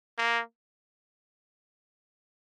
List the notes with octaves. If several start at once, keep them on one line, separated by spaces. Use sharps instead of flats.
A#3